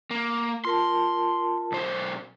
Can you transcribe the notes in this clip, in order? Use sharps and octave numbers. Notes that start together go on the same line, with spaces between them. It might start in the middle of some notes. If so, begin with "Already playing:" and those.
A#3
F4 A#4 A5 C6
B1 C5